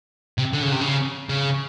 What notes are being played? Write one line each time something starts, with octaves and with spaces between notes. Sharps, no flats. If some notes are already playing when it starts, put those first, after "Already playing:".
C3
D3
C#3
C3
C#3
C#3